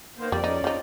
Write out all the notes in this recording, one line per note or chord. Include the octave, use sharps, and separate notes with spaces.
D#3 A#3 B3 C5
F2 G3 D5
C#4 D#4
F3 D#4